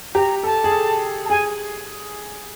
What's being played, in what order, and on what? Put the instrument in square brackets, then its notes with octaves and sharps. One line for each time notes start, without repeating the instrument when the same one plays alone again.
[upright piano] G4 [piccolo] A#5
[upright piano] A4 [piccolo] A5
[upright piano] G#4
A4
[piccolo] A5
[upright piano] G#4 [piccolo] G#5